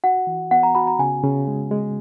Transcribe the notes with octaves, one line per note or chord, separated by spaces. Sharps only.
F#4 F#5
E3
B3 F#5
A#5
F#4 B5
A#5
C#3 G#5
C#3
G#3
G#3